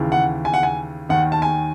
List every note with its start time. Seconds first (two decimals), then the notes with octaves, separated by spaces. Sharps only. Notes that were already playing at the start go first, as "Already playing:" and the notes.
Already playing: D#2 C#3 E3
0.12 F#5
0.45 G#5
0.54 F#5
0.63 G#5
1.09 D#2 D#3 F#5
1.32 A5
1.42 G#5